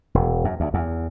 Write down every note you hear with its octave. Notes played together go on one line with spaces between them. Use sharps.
E1
F#2
D2
E2